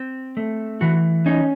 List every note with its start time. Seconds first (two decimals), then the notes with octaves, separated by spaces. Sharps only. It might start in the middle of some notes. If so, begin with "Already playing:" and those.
Already playing: C4
0.37 A3
0.81 E3 F#4
1.26 C#4 D#4